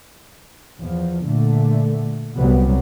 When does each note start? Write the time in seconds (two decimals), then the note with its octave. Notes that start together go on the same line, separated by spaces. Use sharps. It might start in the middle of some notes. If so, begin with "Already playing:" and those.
0.81 E2 F3
1.25 A#2 D3 A3
2.36 C2 C3 F#3 G3 B3